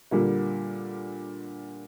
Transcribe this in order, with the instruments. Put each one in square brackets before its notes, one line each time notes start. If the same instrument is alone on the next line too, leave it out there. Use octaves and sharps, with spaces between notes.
[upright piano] A#2 D3 G3 A#3